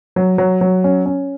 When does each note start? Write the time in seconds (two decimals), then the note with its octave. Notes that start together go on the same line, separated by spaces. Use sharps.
0.16 F#3
0.38 F#3
0.61 F#3
0.84 C#4
1.06 C#4